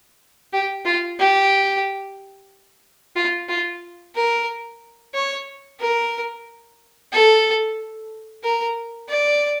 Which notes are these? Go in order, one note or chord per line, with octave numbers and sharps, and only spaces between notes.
G4
F4
G4
F4
F4
A#4
C#5
A#4
A4
A#4
D5